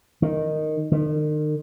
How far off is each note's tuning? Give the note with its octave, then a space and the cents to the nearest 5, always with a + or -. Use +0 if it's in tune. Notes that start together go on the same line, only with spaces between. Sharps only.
D#3 -10
D#3 -40